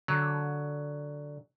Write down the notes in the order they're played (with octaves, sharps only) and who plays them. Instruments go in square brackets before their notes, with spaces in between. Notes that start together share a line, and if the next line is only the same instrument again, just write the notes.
[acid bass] D3 [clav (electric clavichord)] F#3